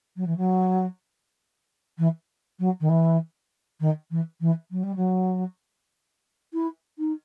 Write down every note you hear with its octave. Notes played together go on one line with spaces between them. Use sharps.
F#3
E3
F#3
E3
F#3
D#3
E3
D#3
E3
E3
F#3
G3
F#3
E4
D#4